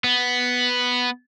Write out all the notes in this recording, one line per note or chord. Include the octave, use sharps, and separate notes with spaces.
B3